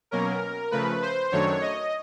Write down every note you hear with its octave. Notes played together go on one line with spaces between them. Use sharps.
B2 F#3 A#3 C#4 A#4
C#3 F3 A3 B4
C5
F#2 D#3 F#3 A3 D4 C#5
D#5